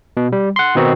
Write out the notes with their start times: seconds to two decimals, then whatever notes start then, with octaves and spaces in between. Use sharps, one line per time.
0.17 B2
0.32 G3
0.56 F#5 C6
0.75 B2 D#3 B3 C4 D#4 F#4